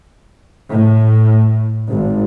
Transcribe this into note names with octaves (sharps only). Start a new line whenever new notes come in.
A2
G#1